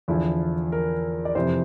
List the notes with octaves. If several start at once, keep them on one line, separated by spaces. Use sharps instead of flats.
E2 D3 F3 E4
A#4
D5
F2 C3 E3 C5